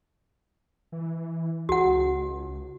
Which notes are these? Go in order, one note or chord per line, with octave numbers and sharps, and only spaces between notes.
E3
C#2 F#4 F#5